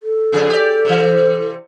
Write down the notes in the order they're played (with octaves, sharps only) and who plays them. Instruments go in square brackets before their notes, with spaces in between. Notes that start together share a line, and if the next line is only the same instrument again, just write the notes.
[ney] A4
[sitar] F2 C#3 G#4
G4 D5
C3 E3